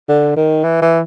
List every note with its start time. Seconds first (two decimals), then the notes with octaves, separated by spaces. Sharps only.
0.09 D3
0.36 D#3
0.64 E3
0.81 E3